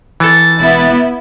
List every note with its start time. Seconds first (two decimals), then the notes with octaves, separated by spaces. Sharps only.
0.20 E3 A4 A6
0.59 E1 B3 E4